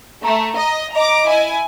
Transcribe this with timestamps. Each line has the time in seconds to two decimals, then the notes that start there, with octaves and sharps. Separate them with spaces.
0.24 A3 A#5
0.58 D#5
0.96 D#5 A#5 D6
1.28 E4 G#5